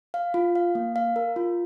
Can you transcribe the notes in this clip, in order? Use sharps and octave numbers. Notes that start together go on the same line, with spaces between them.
F5
F4
F5
A#3
F5
A#4
F4